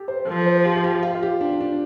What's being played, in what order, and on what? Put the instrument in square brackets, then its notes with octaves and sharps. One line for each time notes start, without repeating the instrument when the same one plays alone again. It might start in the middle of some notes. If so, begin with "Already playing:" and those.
Already playing: [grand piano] G4 A4
C5
[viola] F3 [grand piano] A4
[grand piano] C5
G4
F4
G4
F4
F4
G4
D4
D4